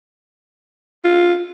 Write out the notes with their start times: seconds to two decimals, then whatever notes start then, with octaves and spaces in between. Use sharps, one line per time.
1.04 F4